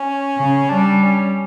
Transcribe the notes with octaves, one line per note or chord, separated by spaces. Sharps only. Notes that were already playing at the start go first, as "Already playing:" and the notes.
Already playing: C#4
C#3
G3 D4
C#4